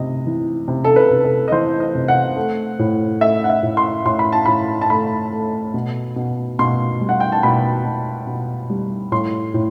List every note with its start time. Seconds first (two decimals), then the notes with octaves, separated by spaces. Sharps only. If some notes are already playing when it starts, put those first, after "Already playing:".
Already playing: C3 D#5
0.26 E3
0.68 C3
0.84 A4
0.96 B4
1.10 C3
1.24 A4
1.48 D#5
1.52 E3 C5
1.80 D#5
1.95 C3
2.08 F#5
2.36 A3
2.79 A2
3.21 A3 E5
3.44 F#5
3.50 E5
3.63 A2
3.77 C6
4.05 A2 C6
4.19 B5
4.32 A5
4.46 A2 B5
4.81 A5
4.90 A3 B5
5.32 A3
5.74 B2
6.16 B2
6.59 B2 C6
7.01 G3
7.09 F#5
7.20 G5
7.32 A5
7.43 B2 B5
7.85 B2
8.27 B2
8.70 G3
9.12 A2 C6
9.54 A2